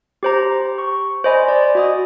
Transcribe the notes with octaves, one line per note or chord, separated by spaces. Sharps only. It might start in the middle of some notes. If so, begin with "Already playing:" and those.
G4 C5 A#5
C#6
C5 D5 D#5 G#5 B5
D5
F#4 D#5 D#6